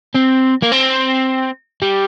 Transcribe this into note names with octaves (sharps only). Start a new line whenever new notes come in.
C4
A#3
C4
G3